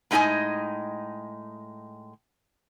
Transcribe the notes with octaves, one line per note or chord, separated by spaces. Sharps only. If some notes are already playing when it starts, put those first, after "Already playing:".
A2 G#3 D#4 G4 D#5 G#5